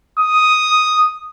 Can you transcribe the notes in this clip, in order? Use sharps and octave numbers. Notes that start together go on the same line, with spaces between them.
D#6